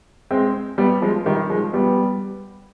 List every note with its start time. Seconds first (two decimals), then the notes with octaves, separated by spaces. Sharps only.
0.31 G#3 C4
0.78 G3 B3
1.02 F3 G#3
1.26 D#3 G3
1.50 F3 G#3
1.73 G3 B3